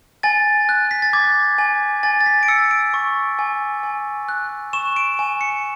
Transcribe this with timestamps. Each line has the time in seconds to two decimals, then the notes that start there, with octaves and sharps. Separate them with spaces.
0.23 G#5 A6
0.69 F#6
0.91 B6
1.02 A6
1.13 D6 G#6
1.58 G#5
2.03 G#5 A6
2.21 A6
2.26 B6
2.43 D7
2.48 E6 C#7
2.71 D7
2.94 C#6
3.39 G#5
3.83 G#5
4.29 F#6
4.73 C#6 E7
4.96 D7
5.19 G#5
5.41 C#7